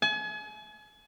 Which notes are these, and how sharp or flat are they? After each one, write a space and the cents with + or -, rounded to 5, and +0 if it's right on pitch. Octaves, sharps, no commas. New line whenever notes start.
G#5 +40